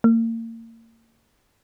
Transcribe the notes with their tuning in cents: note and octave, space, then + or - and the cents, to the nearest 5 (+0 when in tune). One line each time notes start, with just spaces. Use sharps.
A#3 -35